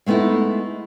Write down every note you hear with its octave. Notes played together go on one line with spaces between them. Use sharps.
G#3 A3 B3 D#4 E4